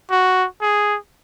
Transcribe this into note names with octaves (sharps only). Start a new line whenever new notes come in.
F#4
G#4